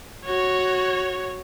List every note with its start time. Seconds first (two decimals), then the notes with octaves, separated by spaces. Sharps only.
0.25 F#4 C#5